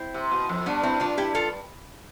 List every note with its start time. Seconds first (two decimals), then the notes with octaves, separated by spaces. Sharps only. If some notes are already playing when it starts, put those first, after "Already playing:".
Already playing: C4 E4
0.14 C3
0.31 B2
0.49 F2
0.66 G2 B3 D4
0.83 C4 E4
1.00 D4 F4
1.17 E4 G4
1.35 F4 A4